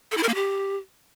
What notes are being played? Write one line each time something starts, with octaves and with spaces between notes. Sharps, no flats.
A4
E4
A#4
A#3
G4